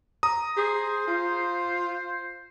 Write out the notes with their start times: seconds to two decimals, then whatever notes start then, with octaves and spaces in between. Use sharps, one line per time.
0.23 A#5 D#6
0.57 G#4 C5
1.08 F4